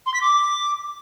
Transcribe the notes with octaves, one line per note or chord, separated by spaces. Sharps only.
C6
B6
D6